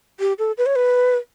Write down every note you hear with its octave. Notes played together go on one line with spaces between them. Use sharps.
G4
A4
B4
C#5
B4